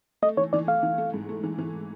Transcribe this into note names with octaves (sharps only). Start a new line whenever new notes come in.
A3 D#5
E3 C#5
E3 D5
A3 F5
E3
A3
G#2
A3
E3
E3